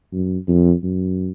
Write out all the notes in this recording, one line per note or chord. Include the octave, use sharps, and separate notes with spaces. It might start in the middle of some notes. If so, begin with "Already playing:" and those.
F#2
F2
F#2